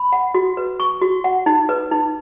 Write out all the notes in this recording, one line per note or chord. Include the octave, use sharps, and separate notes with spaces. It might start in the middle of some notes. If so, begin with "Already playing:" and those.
Already playing: B5
F#5
F#4
B4
C#6
F#4
F#5
D#4
B4
D#4